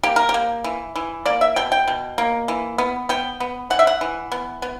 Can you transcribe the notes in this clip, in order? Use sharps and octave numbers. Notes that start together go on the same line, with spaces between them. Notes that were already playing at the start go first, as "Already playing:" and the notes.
A#3 G4
A#4
G4
A#3
E3
E3
A#3 D5
E5
B2 G5
G5
B2
A#3
E3
B3
B3 G5
B3
E3 F#5
E5
F#5
E3
B3
B3